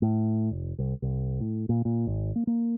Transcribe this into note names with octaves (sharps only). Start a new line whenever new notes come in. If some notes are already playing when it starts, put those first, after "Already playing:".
A2
F1
C2
C2
A2
A#2
A#2
G#1
A#3
A#3